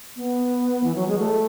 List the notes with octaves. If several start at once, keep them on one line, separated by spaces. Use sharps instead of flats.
B3
E3
F#3
G#3
A3